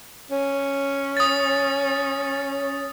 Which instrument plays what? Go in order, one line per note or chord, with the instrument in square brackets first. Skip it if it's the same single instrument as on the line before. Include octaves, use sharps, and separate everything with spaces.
[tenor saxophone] C#4
[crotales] D#6 A6